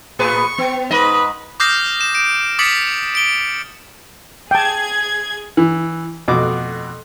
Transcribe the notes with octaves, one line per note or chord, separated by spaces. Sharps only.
A2 G#4 B4 C#6
B3
G#2 B4 D#5
D6 D#6 F6 G6 A#6 C7
E7
D7
D6 D#6 A6 B6 C#7 F#7
D7 G7
G#4 G5 A5 G#6
E3
F2 B2 A3 F#4 D6